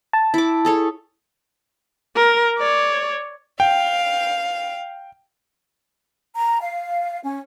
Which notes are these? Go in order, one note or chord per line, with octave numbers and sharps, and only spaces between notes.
A5
E4 D6
G#4 A4 C#5
A#4
C#5 D5
F5 G5
A#5
F5
C#4